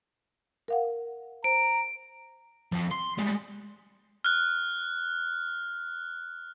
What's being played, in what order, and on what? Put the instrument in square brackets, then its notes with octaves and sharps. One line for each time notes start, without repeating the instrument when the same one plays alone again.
[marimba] A#4 F5 F#5
[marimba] C5 [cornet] A#5 [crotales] D7
[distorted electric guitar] F3 A4
C6
G3 G#3
[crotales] F6 F#6